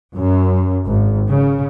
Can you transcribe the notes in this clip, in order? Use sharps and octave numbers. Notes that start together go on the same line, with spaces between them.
F#2
G#1
C#3